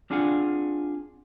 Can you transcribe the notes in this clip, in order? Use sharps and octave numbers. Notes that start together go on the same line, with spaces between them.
C4 D4 F4 G#4 F5 F#5